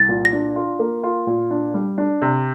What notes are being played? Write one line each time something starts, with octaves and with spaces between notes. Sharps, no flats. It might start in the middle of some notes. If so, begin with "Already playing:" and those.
Already playing: C2 A6
A#2
A#6
D4
F4
A#3
F4
A#2
D4
G3
D4
C3